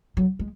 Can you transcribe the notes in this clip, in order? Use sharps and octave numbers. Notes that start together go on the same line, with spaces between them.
F#3
G#3